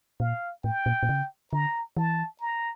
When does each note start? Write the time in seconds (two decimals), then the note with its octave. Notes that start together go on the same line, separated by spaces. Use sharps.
0.20 A#2 F5
0.64 A2 G5
0.86 A#2
1.03 A#2
1.09 C#3
1.53 D3 A#5
1.97 E3 A5
2.41 A#5